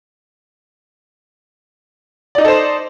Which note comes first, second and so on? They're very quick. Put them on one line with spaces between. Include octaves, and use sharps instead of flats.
D5 D#4 D#5 A4 C5